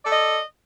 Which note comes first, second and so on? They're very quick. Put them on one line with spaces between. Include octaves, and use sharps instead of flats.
D5 A4 D#5